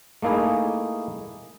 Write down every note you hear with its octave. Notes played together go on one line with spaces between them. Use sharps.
A3 A#3 D#4 E4 G#4